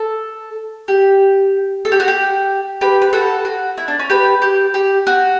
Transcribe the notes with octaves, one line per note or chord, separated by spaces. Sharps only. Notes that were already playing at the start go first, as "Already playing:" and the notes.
Already playing: A4
G4
A4
G4
F#4
G4
G4 B4
B4
F#4 A4
F#4
E4
D4
C#4
G4 B4
G4
G4
F#4